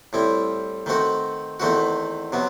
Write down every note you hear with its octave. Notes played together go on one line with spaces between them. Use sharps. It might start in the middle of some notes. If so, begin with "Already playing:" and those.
A2 G3 C4 E4
D#3 A3 C4 F#4
E2 D#3 A3 C4 F#4
C3 F#3 B3